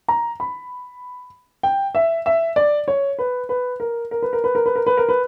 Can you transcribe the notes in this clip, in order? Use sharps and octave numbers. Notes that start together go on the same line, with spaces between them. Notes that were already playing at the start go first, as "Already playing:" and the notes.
A#5
B5
G5
E5
E5
D5
C#5
B4
B4
A#4
A#4
B4
A#4
B4
A#4
B4
A#4
B4
A#4
B4